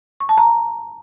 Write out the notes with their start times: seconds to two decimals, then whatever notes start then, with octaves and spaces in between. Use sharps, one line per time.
0.20 C#6
0.29 A5
0.38 A#5